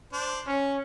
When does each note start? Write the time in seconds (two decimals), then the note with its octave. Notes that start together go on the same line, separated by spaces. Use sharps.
0.13 D4 C5
0.47 C#4 C#6